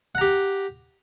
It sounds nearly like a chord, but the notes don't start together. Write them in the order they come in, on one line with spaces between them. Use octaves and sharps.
F#5 A#5 G4